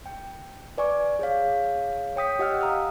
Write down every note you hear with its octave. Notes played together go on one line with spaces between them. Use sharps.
G5
B4 D5 G#5 C#6 D6
G#4 C#5 F5
C#5 G5 D#6 B6
G4 D#5 F#5 G5 E6 F6
F5 A#5 D#6 F6